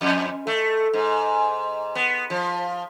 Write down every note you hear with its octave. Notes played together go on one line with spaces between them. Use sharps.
F2
A3
G#2
B3
F3